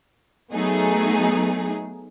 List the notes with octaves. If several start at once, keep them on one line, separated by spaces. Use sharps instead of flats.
F#3 A3 B3 D#4 G#4